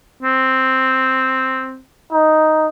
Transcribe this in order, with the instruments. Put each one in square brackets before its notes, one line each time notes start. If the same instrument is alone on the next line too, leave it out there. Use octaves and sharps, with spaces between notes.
[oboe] C4
[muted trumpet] D#4